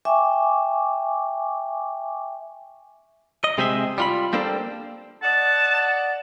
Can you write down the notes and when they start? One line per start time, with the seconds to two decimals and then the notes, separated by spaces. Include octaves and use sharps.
0.05 E5 G5 G#5 C#6 D6
3.44 D#5
3.58 C3 G#3 C4 G4 G#4 E5
3.98 G3 F4 B5
4.33 G3 A#3 C4 D4 A4
5.23 D5 D#5 F#5 A5